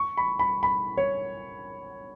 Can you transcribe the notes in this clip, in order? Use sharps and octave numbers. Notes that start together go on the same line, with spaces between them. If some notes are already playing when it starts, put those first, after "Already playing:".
Already playing: C#6
B5
B5
B5
C#5